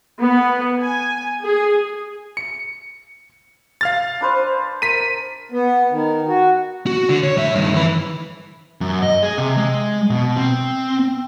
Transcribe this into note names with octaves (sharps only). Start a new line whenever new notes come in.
B3
G#5
G#4
C#7
F5 F6 A6
D4 B4 C5
A#4 B6 D#7
B3
D#3
F#4
F#4
D3
C#5
A2 E5
G2 D#3
E3 B4
F#2
D#5
G#4
C3
G#3
B2
C4